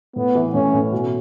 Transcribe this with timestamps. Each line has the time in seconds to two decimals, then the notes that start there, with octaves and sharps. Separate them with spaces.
0.16 A2 B3
0.35 E3
0.54 A2 C#4
0.74 A2
0.92 B2